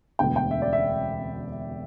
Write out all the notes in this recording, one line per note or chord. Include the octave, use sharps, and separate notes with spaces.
E1 D2 D3 B3 G5
G5
E5
D5
E5